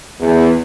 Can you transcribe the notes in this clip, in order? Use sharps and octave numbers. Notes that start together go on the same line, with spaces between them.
E2